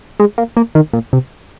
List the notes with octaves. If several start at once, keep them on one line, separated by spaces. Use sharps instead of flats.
G#3
A#3
A#3
D#3
A#2
C3